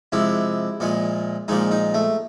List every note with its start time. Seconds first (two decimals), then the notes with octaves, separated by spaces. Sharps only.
0.12 C3 F3 G#3 E4
0.80 A#2 F3 G#3
1.48 A#2 F3 G#3 D#4
1.71 D#4
1.94 A3